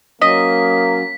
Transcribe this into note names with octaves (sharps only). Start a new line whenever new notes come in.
F#3 A#3 C#4 D#5 B6